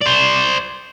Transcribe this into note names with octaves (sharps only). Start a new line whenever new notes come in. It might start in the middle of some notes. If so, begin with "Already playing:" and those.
C5 D5